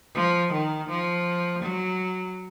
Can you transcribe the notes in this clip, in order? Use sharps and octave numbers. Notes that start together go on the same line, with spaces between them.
F3
D#3
F3
F#3